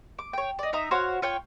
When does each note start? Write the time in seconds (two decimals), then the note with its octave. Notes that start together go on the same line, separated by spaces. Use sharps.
0.19 D6
0.33 C#5 G5
0.59 D5 D#5
0.73 D#4 E5 A#5 D#6
0.91 F#4 C5 C#5 F5
1.22 F4 C#5 G5